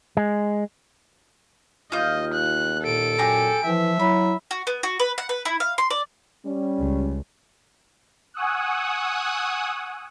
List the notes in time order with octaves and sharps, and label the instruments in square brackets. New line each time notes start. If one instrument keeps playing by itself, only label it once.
[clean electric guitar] G#3
[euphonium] D#2 [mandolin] F4 G6 [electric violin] D#5
[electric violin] F#6
[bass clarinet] A#2 [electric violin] A4 D7
[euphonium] F#2 [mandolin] G4 G#4 A#5
[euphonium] E3 [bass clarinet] F3 [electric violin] E5
[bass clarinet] F#3 [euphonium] E4 [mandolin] B5
[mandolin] F#4
B3
F#4
B4
F#5
B4
E4
F5
C6
D5
[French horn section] G3 C#4
[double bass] C#2
[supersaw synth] F#5 G#5 C#6 D#6 E6 F#6